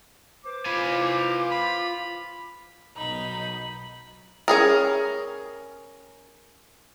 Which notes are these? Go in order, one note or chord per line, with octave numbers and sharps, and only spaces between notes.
B4 C5 D6
F4 G#5 B5
E4
B5
B1 B2 F#3 D#4 B5
C#4 G#4 A#4